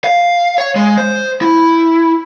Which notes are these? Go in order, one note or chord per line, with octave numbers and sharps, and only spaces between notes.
F5
C#5
G#3
C5
E4